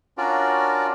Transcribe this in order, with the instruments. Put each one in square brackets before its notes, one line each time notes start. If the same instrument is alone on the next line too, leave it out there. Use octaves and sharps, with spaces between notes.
[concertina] C#4 D4 F4 F#4 A#4 D5